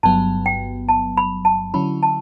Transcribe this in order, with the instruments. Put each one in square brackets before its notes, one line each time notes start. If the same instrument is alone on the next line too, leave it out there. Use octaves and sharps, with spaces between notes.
[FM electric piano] G1 G2 F#3 B3 [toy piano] A5
[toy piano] G5
A5
B5
A5
[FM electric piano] D3 F#3 C#4 E4 [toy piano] B5
[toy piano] A5